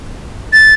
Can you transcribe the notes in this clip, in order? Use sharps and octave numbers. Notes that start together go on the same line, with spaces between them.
A6